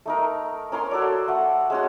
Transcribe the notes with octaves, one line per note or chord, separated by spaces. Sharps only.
A3 D#4 A#4
C#4 A#4 C#5 C6
F#4 A4 D5
A3 F#5
G#3 C#4 F#4